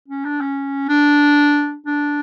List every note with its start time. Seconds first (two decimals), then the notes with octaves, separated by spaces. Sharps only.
0.08 C#4
0.25 D4
0.41 C#4
0.88 D4
1.86 D4